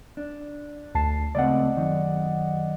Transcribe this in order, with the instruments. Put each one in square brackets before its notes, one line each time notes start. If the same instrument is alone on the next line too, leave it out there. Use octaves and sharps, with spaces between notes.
[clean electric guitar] D4
[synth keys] D2 A5 C7
[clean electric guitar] C#2 A3 C4 [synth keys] D5 D#5 F#5
[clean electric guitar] F#2 D#3